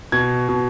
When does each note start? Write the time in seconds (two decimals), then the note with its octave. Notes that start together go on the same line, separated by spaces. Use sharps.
0.12 B2 G#6
0.49 B2